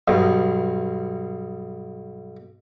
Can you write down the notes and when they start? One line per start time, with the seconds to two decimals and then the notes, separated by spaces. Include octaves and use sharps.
0.08 B1 G2